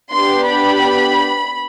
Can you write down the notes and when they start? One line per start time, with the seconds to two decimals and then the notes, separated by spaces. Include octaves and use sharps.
0.13 B3 D4 G4 C6
0.48 B5